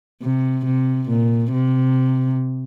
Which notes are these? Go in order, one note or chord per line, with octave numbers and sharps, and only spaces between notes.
C3
C3
A#2
C3